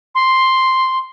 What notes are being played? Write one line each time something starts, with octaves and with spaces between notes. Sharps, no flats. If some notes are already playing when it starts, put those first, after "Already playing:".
C6